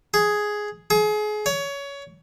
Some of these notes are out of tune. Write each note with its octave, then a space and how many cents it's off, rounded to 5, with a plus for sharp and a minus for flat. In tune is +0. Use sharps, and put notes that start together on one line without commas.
G#4 +5
G#4 +30
C#5 +20